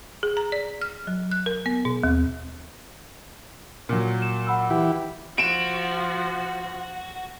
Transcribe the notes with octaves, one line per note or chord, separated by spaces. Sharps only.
G#4
A#5
D5
F6
F#3
F#6
A#4
B3
B2
D#2
A#2 F#3
E7
F#5 B5 E6
E3 E4 G4
F3 F#4 D7 E7